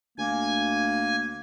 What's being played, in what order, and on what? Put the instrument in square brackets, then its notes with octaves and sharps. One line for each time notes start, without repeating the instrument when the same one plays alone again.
[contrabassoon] D2 [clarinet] A#3 [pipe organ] G#5